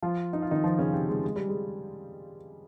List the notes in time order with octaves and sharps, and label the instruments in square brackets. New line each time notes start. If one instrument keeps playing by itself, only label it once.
[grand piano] F3 F4
D#4
F4
D#3 D#4
F3 F4
C#3 C#4
C3 C4
G#3
G#3
G3
G#3